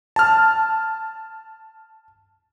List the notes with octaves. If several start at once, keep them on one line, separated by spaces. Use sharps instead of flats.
A5 F6